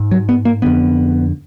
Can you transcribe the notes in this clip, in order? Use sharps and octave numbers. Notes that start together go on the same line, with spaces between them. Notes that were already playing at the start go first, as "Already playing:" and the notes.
Already playing: G#2
F#3
B3
A#3
F2 D3 B3